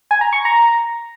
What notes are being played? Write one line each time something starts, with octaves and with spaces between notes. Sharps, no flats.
G#5
A#5
C#6
A#5